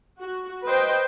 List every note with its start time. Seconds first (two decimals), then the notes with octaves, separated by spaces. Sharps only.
0.20 F#4
0.65 B4 C5 D#5 G5